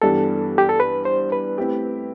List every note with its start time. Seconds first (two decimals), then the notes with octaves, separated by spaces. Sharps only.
0.02 G2 E3 G3 B3 D4 A4
0.58 G4
0.69 A4
0.80 B4
1.05 C5
1.32 B4
1.58 A3 C4 E4 G4